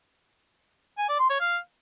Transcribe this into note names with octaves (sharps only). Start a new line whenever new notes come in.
G#5
D5
C6
C#5
F5